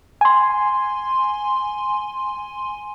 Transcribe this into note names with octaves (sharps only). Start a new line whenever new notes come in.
G#5 C6